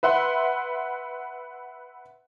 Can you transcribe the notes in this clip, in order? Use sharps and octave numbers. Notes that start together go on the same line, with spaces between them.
B4 E5 F#5 C6